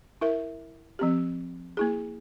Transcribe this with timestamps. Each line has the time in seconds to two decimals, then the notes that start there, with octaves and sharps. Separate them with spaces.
0.21 E4 A#4 E5
0.99 F3 C4 G4
1.77 A#3 E4 G#4